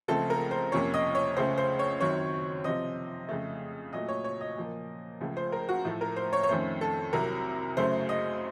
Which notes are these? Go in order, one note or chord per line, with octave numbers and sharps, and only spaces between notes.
C#2 C#3 F3 A3 C4 A4
A#4
C5
F2 C3 F3 A#3 C#4 C#5
D#5
C#5
C#2 C#3 A3 C#4 C5
C5
C#5
F#2 D#3 F#3 C4 C#5
C3 F3 C4 D#5
F2 C#3 A3
A#2 F#3 A3 D#5
C#5
C#5
D#5
A#2 F3 A#3
C#2 C#3 F3 A3
C5
A#4
F#4
A2 F3 A3
A#4
C5
C#5
C#5
F2 D#3 A3 C#4 C5
A4
C2 C3 F#3 A#4
F#2 C#3 F#3 A3 C5
D#5